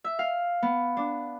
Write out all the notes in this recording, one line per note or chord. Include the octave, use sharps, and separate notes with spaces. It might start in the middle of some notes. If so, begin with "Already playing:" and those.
E5
F5
B3
D4